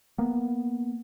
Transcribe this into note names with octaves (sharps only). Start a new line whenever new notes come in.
A#3 B3